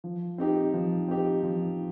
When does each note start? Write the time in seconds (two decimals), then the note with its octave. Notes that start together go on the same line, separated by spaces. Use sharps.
0.04 F3
0.38 C4 D#4 G4
0.74 F3
1.08 C4 D#4 G4
1.43 F3